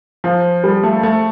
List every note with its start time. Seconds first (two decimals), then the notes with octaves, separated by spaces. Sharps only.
0.24 F3
0.64 G3
0.83 A3
1.03 A3